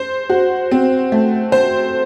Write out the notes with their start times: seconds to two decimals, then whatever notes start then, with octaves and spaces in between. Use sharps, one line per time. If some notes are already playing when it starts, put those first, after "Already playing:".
Already playing: C5
0.29 F#4
0.71 C4
1.12 A3
1.52 C5